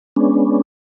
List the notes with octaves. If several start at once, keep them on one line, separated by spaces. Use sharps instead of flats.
G#3 B3 C#4 D4